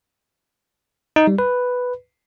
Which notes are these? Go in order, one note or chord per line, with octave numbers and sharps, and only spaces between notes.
D#4
G3
B4